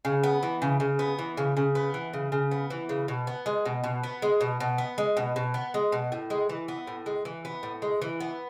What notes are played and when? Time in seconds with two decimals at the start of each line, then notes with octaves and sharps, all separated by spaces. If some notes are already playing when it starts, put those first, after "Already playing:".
0.05 C#3
0.23 B3
0.43 E3
0.62 C#3
0.80 C#3
0.99 B3
1.19 E3
1.37 C#3
1.57 C#3
1.75 B3
1.94 E3
2.13 C#3
2.32 C#3
2.51 B3
2.70 E3
2.89 C#3
3.08 B2
3.27 B3
3.46 G#3
3.65 B2
3.84 B2
4.03 B3
4.22 G#3
4.41 B2
4.60 B2
4.78 B3
4.98 G#3
5.17 B2
5.36 B2
5.54 B3
5.74 G#3
5.92 B2
6.12 A2
6.30 G#3
6.49 E3
6.68 B3
6.87 A2
7.06 G#3
7.25 E3
7.45 B3
7.63 A2
7.82 G#3
8.02 E3
8.20 B3